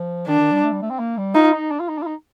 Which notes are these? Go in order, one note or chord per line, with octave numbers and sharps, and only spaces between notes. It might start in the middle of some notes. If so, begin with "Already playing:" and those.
Already playing: F3
D#3 D4
D#3
G3
A3
G3
A3
C4
A#3
G3
D#4 F4
D#4
D4
F4
D#4
D4
F4
D#4